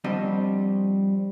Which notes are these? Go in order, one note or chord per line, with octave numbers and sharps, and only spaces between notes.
F3 G3 C4 D4 F#4 D#5